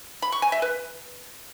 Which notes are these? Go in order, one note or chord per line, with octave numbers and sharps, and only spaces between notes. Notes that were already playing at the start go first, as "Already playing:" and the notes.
B5
C#6
G#5
E5
B4